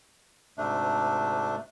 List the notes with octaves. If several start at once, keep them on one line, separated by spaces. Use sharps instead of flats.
D2 G#2 C3 A3 D4